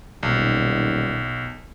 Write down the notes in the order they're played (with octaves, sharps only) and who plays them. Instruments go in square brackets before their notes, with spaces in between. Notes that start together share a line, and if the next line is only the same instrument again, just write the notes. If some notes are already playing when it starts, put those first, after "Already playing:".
[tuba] D#1 [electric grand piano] B1